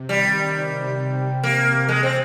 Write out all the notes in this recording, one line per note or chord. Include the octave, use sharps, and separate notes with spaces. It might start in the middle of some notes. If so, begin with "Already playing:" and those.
Already playing: C3
D#3 G3
C3
A#3
G#3
C4